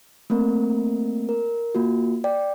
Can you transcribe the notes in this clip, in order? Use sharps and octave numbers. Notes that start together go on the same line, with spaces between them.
A3 A#3 C4 A#4
A#4
A#3 F4 F#4
D5 G5